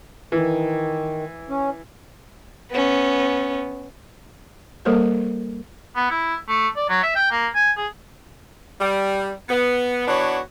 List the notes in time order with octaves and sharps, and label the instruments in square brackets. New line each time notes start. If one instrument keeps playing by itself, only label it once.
[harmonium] D#3 [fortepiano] E3
[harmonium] C#4
[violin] B3 C#4
[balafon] G3 A#3 A4 A#4 C5 C#5
[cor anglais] B3
E4
A3
D5
F#3
E5
G5
A#3
G#5
G#4
[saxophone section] G3
B3
E3 B3 D4 F#4 C#5